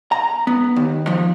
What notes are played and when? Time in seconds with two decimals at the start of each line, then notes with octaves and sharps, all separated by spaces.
0.12 A#5
0.47 B3
0.76 D#2
1.07 F3